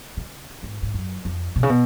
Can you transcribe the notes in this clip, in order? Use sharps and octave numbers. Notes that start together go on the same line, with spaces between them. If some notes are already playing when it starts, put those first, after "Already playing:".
C#3
G#2
G#2
F#2
F2
B2
C#3
B2